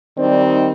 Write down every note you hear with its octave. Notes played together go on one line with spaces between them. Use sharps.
D#3 G3 C4 D#4 D5